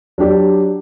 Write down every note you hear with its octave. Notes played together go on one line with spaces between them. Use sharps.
F#3 D4 G4 D5